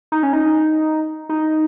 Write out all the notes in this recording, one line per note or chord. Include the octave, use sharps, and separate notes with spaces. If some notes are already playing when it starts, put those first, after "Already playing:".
D#4
C#4
D#4
D#4